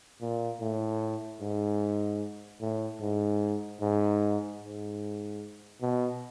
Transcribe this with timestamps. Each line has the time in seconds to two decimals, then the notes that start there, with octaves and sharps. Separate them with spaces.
0.21 A#2
0.60 A2
1.41 G#2
2.61 A2
3.01 G#2
3.81 G#2
4.61 G#2
5.82 B2